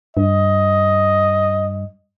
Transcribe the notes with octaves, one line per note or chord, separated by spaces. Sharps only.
G2 D#5